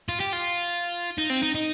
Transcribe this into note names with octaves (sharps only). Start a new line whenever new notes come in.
F4
G4
F4
D#4
C4
D#4
D#4